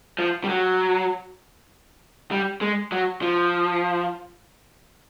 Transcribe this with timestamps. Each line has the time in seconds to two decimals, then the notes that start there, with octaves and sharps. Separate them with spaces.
0.19 F3
0.44 G3
0.49 F#3
2.31 G3
2.61 G#3
2.92 F#3
3.22 F3